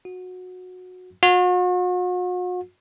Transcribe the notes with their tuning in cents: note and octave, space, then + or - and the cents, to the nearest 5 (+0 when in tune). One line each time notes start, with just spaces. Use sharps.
F#4 -20
F#4 -45